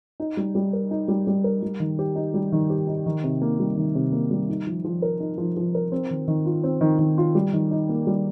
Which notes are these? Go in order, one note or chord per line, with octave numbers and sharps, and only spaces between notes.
D#4
G3
G3
A#4
D#4
G3
G3
A#4
G3
D#3
G4
D#4
G3
D#3
G4
D#4
D#3
C3
A#3
G3
D#3
C3
A#3
G3
D#4
F3
F3
A#4
D#4
F3
F3
A#4
C4
D#3
D#3
F4
C4
D#3
D#3
F4
G3
D#3
D#4
A#3
G3